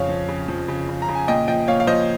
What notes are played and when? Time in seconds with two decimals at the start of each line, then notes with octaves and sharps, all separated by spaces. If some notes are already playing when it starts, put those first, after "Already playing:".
Already playing: F2 C#3 C#5 F5
0.09 F3
0.29 C#3
0.48 F3
0.68 C#3
0.89 C#3
1.02 A#5
1.08 C#3
1.15 G#5
1.28 A#2 D#5 G5
1.48 F3 D#5 G5
1.68 A#2 C#5 F5
1.80 F5
1.87 F3 C5 D#5